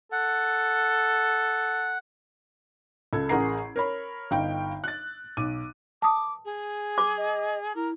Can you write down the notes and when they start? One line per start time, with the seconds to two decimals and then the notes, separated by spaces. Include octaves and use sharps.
0.12 A4 F#5
3.13 C#2 A4 G#6
3.29 A1 G#4 A#4 F#5 A#5 C7
3.76 A#4 C#5 B5
4.31 G1 D#4 F5 G5
4.84 F#6 A6
5.37 B1 D6 D#7
6.02 A5 D6 D#6
6.45 G#4
6.98 D6
7.18 D#5
7.75 E4 A#4